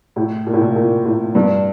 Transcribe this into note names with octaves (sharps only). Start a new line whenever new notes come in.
A2
A#2
A2
A#2
A#2
A2
G2